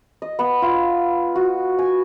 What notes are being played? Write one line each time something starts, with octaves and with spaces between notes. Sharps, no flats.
D#5
B3
F4
F#4
G#5